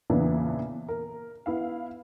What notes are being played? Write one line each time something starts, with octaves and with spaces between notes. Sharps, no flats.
E2 A#2 C#3 E3 B3 D4
A#4
B3 E4 F5